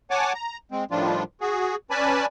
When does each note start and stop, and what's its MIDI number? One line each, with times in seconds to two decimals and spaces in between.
0.11 0.33 73
0.11 0.33 78
0.11 0.33 80
0.11 0.33 81
0.11 0.33 86
0.34 0.57 82
0.72 0.84 56
0.72 0.84 60
0.91 1.23 45
0.91 1.23 51
0.91 1.23 53
0.91 1.23 55
0.91 1.23 62
0.91 1.23 65
1.41 1.75 66
1.41 1.75 68
1.91 2.26 61
1.91 2.26 71
1.91 2.26 74
1.91 2.26 80
1.91 2.26 81
1.91 2.26 83